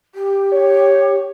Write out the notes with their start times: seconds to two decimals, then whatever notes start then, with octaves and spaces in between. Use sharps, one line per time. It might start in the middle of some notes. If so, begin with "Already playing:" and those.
0.15 G4
0.52 C#5